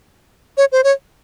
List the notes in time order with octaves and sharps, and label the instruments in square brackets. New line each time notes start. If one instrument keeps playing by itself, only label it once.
[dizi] C#5
C5
C#5